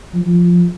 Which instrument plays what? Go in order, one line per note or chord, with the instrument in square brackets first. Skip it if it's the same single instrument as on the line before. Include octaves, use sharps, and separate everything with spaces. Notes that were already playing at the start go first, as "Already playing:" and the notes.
[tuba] F3